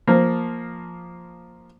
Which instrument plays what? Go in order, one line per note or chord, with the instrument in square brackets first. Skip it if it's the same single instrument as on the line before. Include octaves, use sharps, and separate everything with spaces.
[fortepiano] F3 A#3